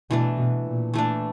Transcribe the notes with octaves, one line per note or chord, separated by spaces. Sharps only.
B2 E3 A3 D4
B2
A#2
E3 A3 D4